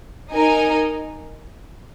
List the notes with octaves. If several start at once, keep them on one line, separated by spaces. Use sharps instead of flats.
D#4 A#4 D#5 G#5